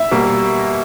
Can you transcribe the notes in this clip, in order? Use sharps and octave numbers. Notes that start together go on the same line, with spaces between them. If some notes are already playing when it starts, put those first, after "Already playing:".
Already playing: E5
B2 G3 A#3